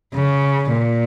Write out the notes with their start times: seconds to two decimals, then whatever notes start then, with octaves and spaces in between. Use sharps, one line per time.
0.15 C#3
0.71 A#2